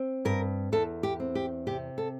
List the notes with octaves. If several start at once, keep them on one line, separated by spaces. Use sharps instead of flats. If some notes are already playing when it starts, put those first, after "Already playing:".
Already playing: C4
G2 A#4
E2 A4
G4
C4
G4
C3 G4
A4